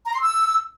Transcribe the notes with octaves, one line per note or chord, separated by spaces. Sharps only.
A#5
C6
E6